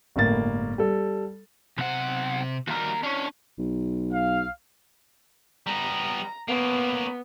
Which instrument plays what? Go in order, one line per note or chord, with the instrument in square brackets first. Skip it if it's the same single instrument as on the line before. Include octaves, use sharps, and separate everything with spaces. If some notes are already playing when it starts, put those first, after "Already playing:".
[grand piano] G1 A2 A#3 A6
G3 A4
[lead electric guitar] B1 F#5 [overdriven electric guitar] C3 C5
[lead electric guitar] D#2 A#4 [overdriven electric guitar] G3 F#4
[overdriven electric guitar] C#4 [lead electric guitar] D4 C#5
[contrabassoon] B1
[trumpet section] F5
[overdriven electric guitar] G3 B3 [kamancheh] A#5
[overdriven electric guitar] A#3 C#4 [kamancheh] B3